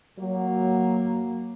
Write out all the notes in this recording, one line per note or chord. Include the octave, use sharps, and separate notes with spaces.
F#3 A#3